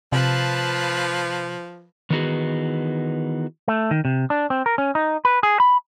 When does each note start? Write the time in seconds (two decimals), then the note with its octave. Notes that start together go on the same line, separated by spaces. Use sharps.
0.12 C3 F3 B4 F5 A5
2.10 D#3 E3 B3 D#4 F#4 G#4
3.68 A3
3.91 D#3
4.05 C3
4.30 D4
4.50 C4
4.66 A#4
4.78 C#4
4.95 D#4
5.25 B4
5.43 G#4
5.60 B5